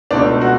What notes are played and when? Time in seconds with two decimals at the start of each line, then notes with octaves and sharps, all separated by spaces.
0.11 C#2 B2 A3 D4
0.41 F#4